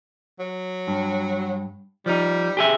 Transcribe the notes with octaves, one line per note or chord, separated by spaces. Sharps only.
F#3
G2
F3 G3 D#4
G4 G#4 E5